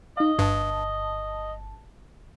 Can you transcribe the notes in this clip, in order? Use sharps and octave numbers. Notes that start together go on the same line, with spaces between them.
D#4 D#5 F5
G1 G2 A5